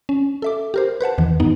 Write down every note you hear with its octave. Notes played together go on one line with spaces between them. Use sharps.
C#4
A4 E5 D6
G4 A#4 C5
B4 C5 F#5 A5
E2 D#3 E3
G2 B3 D#4